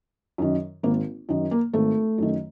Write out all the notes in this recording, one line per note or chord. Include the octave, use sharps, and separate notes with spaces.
F#2 D#3
G#1 A#3
F#2 D#3
A#3
G#1 A3
F#2 D#3